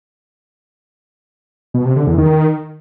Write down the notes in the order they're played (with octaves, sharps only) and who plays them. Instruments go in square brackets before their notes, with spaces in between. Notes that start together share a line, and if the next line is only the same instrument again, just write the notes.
[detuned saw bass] B2
C3
D3
E2
D#3